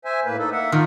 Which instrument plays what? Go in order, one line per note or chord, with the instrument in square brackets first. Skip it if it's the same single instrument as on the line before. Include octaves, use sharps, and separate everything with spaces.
[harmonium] C5 E5 G#5
A2 A#3 B4
D#4 A4
A#3 E5 F#5
[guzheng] D#3 [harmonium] D#4 F4 A#4